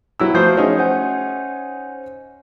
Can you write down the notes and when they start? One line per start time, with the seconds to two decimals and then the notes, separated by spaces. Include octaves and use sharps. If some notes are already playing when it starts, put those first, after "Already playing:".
0.20 F#3 E4 E6
0.35 F3 A3 F#4 C5 G6
0.57 C#4 D#4 G#4
0.78 C5 F#5 G#5